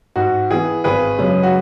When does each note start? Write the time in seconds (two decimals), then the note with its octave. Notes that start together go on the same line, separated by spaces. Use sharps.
0.16 G#2 F#4
0.50 E3 B3 G#4
0.84 G#1 G#4 B4
1.19 F#2 C#3 G#3 C#4
1.43 F#4